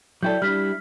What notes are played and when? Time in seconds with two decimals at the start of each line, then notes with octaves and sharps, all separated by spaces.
0.23 F#3 E4 A4 D5 G5 G6
0.42 G3 D4 E4 F6 B6